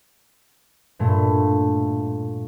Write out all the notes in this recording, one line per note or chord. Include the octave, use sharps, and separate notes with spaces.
G2 A#2 A3